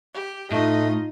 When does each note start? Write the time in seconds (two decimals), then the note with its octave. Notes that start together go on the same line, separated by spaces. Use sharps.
0.14 G4
0.52 A2 A3 D#4 F4 D#5